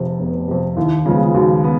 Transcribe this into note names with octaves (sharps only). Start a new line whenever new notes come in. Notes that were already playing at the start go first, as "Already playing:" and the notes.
Already playing: F1 F2 C3
F1 B3
F2 C3
D#2 E4
C#3 F3 G#3 B3 F4
D#2 F#4
B3